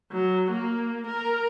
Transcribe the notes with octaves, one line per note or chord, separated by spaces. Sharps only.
F#3
A#3
A#4